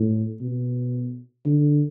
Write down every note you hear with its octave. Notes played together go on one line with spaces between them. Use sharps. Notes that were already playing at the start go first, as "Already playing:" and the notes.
Already playing: A2
B2
D3